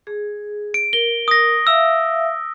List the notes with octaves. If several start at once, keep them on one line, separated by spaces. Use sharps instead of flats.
G#4
D7
A#4 G7
D#6 A#6
E5 F5 E6